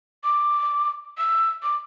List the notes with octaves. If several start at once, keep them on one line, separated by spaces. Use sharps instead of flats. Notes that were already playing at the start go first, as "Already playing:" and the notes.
D6
E6
D6